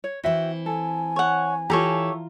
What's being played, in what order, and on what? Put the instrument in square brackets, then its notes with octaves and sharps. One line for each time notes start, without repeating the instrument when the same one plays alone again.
[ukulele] C#5
[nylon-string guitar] E3 C4 [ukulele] F#4 E5 G5
[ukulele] A4 [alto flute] G#5
[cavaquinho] C#5 F#5
[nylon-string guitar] E3 [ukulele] F4 A#5 [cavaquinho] G4 A4 C#5